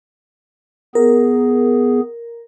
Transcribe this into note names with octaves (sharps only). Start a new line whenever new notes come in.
B3 G#4 A#4